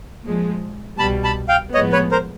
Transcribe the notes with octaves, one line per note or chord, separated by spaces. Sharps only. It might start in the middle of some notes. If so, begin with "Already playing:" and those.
A#2 F3 G#3
C2 B2 G3 A5 B5
A5 B5
F5 G5
A2 F3 G#3 B3 C#5 D#5
B4 C#5
A#4 C5